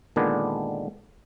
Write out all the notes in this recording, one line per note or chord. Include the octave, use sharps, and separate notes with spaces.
A#2 D3 D#3 G#3 B3 D4